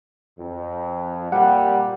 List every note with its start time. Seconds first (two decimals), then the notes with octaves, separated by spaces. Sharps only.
0.39 F2
1.32 A#2 G3 F#5